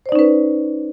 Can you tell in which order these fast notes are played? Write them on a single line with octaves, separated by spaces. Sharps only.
C5 D5 D#4 C#4 B4